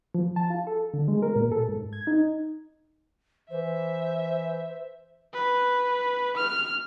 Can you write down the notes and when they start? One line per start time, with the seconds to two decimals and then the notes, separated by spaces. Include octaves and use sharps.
0.15 F3
0.36 A5
0.50 F4
0.67 A4
0.94 D3
1.08 G#3
1.23 A#4
1.36 A#2
1.52 A4
1.69 G#2
1.93 G#6
2.07 D#4
3.51 E3 C5 E5
5.34 B4
6.37 F6